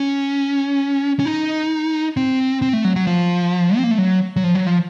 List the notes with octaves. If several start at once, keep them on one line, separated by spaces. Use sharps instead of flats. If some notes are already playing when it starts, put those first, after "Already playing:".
Already playing: C#4
C#4
D#4
C4
C4
A3
F#3
F#3
F3
C4
A#3
A3
F#3
F#3
F3
F#3
F3